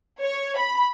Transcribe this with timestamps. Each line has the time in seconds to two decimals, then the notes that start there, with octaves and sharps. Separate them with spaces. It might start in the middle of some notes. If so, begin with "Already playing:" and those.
0.21 C#5
0.58 B5